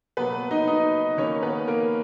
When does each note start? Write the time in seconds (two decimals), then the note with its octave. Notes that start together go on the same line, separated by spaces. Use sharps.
0.17 B2 F#3 A#3 B3 B4
0.51 D#4 D#5
0.68 D#4 D#5
1.18 D#3 A#3 C#4 C#5
1.43 B3 B4
1.68 A#3 A#4